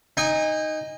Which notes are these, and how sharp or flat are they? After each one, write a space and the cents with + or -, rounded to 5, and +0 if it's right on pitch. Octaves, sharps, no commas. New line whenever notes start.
D#4 +0 G#5 -35